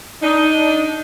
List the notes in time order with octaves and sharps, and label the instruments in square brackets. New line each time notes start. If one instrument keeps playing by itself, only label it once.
[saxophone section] D4 D#4